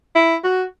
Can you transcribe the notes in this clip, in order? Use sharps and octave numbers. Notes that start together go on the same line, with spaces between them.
E4
F#4